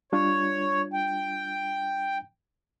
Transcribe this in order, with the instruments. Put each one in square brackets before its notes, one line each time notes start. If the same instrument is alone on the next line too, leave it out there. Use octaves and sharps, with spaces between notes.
[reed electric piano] G3 D4 F4 [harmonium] C#5
[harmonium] G5